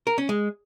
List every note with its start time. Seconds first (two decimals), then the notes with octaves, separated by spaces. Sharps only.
0.07 A#4
0.18 C#4
0.29 G#3